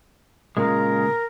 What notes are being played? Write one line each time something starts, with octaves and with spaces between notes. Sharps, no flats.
A#2 C#3 G#3 A#4